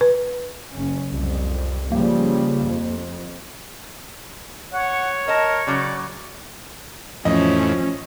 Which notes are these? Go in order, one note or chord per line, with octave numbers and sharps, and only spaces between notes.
B4
F#1 C#4
C2 F2
C#3 F3 G3 A#3
F2
C#5 F#5
A#4 D#5 A5
C#3 F#3 D5
F2 A2 E3 F3 C#4 D#5